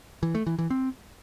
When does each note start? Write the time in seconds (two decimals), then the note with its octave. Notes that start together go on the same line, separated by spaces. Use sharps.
0.23 E3
0.35 A3
0.47 E3
0.58 E3
0.70 C4